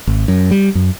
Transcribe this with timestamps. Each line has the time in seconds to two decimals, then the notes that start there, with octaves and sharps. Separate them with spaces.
0.07 G#1
0.28 F#2
0.51 G3
0.75 F#2